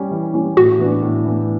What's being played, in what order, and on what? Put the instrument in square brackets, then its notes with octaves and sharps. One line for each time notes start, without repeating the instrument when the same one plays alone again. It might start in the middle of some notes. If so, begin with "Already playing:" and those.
Already playing: [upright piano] G3 C#4
E3
G3 C#4
[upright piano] A2 [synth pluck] F#4
[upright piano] E3 B3 D4
A2
E3 B3 D4